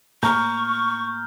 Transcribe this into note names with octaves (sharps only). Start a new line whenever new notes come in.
A2 A#3 A#5 C#6 F6 G6